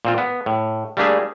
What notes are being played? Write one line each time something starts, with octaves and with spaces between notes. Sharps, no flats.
A#2 C4 F4
B3
A2
G3 A3 A#3 D4 G4 G#4